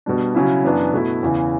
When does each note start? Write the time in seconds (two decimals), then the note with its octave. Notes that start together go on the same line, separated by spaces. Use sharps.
0.06 B2 G3 D4
0.35 C#3 F#3 C#4 E4
0.64 F#2 E3 B3 D4
0.93 B2 A3 E4
1.23 E2 C#3 E3